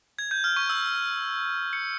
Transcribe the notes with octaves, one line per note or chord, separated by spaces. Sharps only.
G#6
G6
F6
C#6
E6
C#7